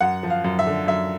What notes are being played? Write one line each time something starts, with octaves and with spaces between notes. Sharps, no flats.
F#2 F#5
F3
F5
F#2
E5
D3
F#2 E5